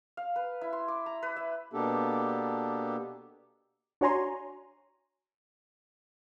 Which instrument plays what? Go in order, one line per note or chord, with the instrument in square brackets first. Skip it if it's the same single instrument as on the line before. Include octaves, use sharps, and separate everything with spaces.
[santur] F5
B4
E4
C6
D6
A#5
B4
E5
[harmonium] B2 A#3 B3 D4 G4 A4
[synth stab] D4 F#4 C#5 G#5 A#5 C6